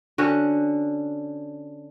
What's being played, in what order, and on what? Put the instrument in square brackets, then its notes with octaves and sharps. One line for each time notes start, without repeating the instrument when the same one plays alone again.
[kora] D3 C#4 F#4